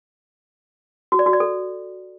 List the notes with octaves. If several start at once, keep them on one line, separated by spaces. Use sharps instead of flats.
F#4
D5
F#4
D5
A4